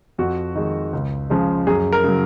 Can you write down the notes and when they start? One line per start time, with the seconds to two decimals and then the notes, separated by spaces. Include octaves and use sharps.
0.18 F2 F#4
0.55 D#3 G#3
0.93 C#2
1.30 C#3 F3 G#3
1.67 F#2 G#4
1.93 A#4
2.04 C#3 F#3